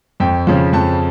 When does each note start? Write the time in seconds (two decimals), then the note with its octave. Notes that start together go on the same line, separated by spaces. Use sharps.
0.20 F2 G5
0.47 C#3 F3
0.73 F2 A5